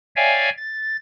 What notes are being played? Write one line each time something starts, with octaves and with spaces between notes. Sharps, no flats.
C#5 D5 E5 F5 G5 G#5
A6